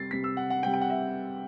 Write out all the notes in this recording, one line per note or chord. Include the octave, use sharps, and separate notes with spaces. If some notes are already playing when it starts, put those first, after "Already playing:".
Already playing: C3 G3 A6 C7
C3 G3 B6
E6
F#5
F#5
C3 G3 G5
G5
F#5
E5